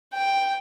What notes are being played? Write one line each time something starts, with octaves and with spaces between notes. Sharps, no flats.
G5